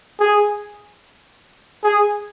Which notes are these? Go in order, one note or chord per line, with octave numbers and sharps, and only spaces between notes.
G#4
G#4